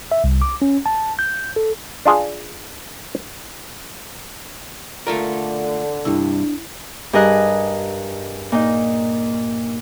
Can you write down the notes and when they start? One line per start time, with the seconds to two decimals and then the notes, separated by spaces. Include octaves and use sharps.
0.12 E5
0.24 C2
0.42 D6
0.62 C#4
0.86 A5
1.19 G6
1.56 A4
2.05 D4 F4 G#4 D5
5.07 D3 A3 F4 A#4
6.05 C2 G2 D4 E4
7.13 G2 G#4 A#4 D#5 F#6
8.52 A#2 D#4